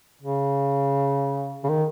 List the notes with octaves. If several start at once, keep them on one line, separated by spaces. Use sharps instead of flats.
C#3
C#3
D#3